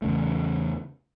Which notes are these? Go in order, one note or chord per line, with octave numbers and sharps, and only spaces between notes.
E2 C#3 A3